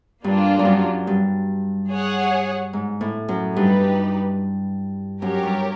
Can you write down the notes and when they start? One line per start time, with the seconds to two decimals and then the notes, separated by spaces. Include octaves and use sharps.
0.24 G2 A#3 D4 F4
0.59 G2
0.65 F#2
1.07 G2
1.90 G#4 C#5 F#5
2.73 G#2
3.01 A2
3.28 F#2
3.56 G2 D#4 G4 B4
5.22 F#2 G4 A#4 C#5
5.43 G2